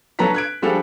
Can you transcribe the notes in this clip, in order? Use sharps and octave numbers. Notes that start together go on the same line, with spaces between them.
F#3 D4 A4 B4 A#5 B6
F#6 G#6 D7
F3 G3 D4 F#4 G#4 A4